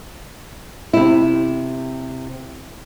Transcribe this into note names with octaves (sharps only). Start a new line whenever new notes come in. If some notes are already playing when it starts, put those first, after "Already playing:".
C3 E4